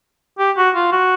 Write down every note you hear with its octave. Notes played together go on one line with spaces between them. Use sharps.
G4
F#4
F4
F#4